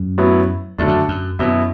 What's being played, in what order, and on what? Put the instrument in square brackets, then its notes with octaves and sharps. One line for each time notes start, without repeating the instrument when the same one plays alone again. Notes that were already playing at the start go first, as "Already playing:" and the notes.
Already playing: [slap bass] F#2
[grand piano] A2 F#3 B3 E4
[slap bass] E2 [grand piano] D3 F#3 A3 D4
[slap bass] F#2
F#2
[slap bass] F#2 [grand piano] B2 F#3 B3 E4